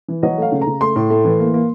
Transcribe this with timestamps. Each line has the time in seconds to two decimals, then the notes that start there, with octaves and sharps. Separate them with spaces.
0.08 E3
0.23 F#3 D#5
0.38 A3 F5
0.52 C#3
0.62 A#5
0.67 C#3
0.81 A3 C6
0.96 A2
1.10 A3
1.25 E3
1.40 A#3
1.54 A#3